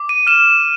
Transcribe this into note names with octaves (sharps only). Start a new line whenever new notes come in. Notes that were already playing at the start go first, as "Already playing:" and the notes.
Already playing: D6
D#7
F6 E7